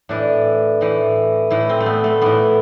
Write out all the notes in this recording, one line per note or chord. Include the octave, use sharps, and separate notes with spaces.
A2 E3 D4
A2 E3
A2 E3 E4
C4
A3
B3
A3
A2 E3 B3